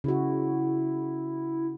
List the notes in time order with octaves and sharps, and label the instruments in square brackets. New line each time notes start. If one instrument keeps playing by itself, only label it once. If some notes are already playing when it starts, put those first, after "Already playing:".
[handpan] C#3 F#4 [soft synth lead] E4